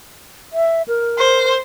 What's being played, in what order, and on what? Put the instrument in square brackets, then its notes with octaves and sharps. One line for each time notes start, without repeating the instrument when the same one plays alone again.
[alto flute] E5
A#4
[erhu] C5